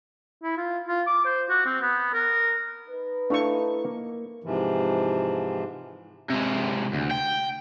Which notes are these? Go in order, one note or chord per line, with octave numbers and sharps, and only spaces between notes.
E4
F4
F4
D6
C5
F#4
C4
B3
A#4
D#4 B4
A3 D4 E4 F5 C#6
A#3
G#2 C3 E3 F3
C3 G#3
D2
G5